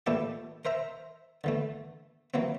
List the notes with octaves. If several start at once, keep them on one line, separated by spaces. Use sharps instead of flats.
A#2 E3 A3 D4 E4 G4
A#4 C5 E5 A#5
D3 E3 A3
E3 F#3 A#3 C4